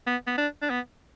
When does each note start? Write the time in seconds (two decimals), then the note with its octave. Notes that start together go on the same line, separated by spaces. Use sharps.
0.07 B3
0.27 B3
0.38 D4
0.62 D4
0.70 B3